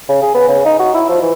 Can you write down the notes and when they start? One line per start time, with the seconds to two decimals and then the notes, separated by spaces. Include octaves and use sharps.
0.09 C#3
0.22 G#4
0.34 B3
0.48 C#3
0.65 D#4
0.79 F#4
0.94 E4
1.09 F3
1.22 E3